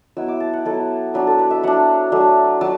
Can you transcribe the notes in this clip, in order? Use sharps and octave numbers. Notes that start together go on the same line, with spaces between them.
F#3 B3 E4 E6
D6
A5
F#5
F#3 B3 E4 A4
F#3 D4 B4
A4
B4
E5
F#3 D4 F#5
F#3 A3 D4
F#3 A5